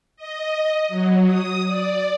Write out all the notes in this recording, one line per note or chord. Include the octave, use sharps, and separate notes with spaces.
D#5
F#3
D#6
D5